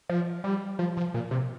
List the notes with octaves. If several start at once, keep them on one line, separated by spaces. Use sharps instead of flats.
F3
G3
F3
F3
A#2
C3